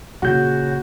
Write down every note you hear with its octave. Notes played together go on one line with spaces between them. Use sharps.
A#2 C#3 F#4 F#5 G6